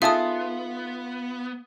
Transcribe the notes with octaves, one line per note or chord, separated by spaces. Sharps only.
B3 D#4 F4 G#4 A4 E5 D#6